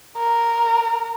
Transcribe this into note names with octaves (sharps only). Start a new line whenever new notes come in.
A#4